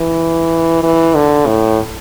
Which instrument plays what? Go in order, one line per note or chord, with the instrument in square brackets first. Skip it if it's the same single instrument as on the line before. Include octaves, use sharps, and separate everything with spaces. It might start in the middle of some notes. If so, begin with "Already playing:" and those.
Already playing: [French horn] E3
E3
D3
A2